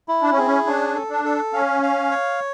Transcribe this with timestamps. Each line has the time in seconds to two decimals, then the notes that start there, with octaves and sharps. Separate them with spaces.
0.08 E4
0.22 D4
0.31 C#4
0.38 C4 G#4
0.46 C#4
0.67 C#4 D4
0.95 A4
1.10 D4
1.25 A4
1.53 C#4 F5
1.83 F5
2.11 C#5